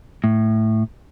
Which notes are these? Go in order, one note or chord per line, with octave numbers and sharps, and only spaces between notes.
A2